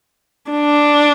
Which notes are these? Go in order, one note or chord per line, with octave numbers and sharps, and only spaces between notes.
D4